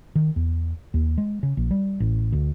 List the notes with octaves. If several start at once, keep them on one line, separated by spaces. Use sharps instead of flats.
D#3
E2
D#2
G#3
C#3
A#1
G3
A1
D2